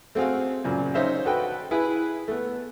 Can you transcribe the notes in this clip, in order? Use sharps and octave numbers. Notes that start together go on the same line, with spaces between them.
A3 C4 F#4 G#4 F5
F#2 A#2 C#3
C#4 D#4 C5 E5 F5
F#4 A4 B4 G5
E4 G#4 B4
A3 B3